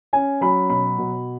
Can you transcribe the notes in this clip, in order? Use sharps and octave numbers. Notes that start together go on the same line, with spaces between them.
C#4 G#5
F#3 B5
B2 B5
B2